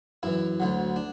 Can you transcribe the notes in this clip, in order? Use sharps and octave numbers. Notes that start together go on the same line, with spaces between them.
F#2 E3 E4
D2 D3 F#3
D4